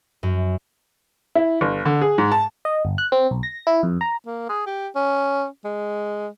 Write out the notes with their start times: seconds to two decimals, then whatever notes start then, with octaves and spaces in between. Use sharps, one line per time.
0.23 F#2
1.35 E4
1.61 G1
1.86 D3
2.02 G#4
2.18 G#2
2.32 A5
2.65 D#5
2.85 G1
2.98 F#6
3.12 C4
3.31 B1
3.43 A#6
3.67 E4
3.83 F2
4.01 A#5
4.26 A#3
4.49 G#4
4.66 G4
4.95 C#4
5.65 G#3